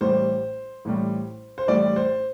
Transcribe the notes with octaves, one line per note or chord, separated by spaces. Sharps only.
A1 A2 G3 C5
A1 A2 G3
C5
A1 A2 G3 D5
C5